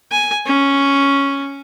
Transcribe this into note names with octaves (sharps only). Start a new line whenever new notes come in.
G#5
C#4